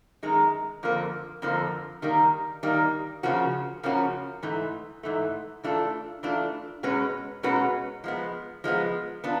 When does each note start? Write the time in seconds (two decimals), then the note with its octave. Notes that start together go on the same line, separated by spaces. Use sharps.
0.23 F#2 D#3 G#3
0.83 F2 D3 F3 A#3
1.42 F2 D3 F3 A#3
2.02 D#3 G3 A#3
2.63 D#3 G3 A#3
3.23 C#3 F3 A#3 C#4 F#4
3.83 C#3 F3 A#3 C#4 F#4
4.43 G#2 E3 A3
5.03 G#2 E3 A3
5.64 E3 A3 D4 F4 A4
6.23 E3 A3 D4 F4 A4
6.83 B2 G#3 C#4 F#4 B4
7.43 B2 G#3 C#4 F#4 B4
8.04 F3 G#3 B3
8.64 F3 G#3 B3
9.24 B3 D4 F4